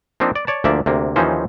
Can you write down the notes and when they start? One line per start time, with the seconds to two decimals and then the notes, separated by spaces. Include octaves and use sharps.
0.20 F3 A#3 C4 D4 D#4
0.36 D5
0.47 C#5 D5 A5
0.64 D2 F3 A#3 D5 E5
0.86 D2 C3 A#3
1.16 D#2 E3 F3 C#4 D#4 C5